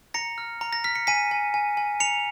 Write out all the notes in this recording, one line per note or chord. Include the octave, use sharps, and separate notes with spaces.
A#5 A#6 C#7
F6
A#5
A#6
F6 B6
C#7
G#5 B6 D#7
G#5
G#5
G#5
A#5 C#7 F7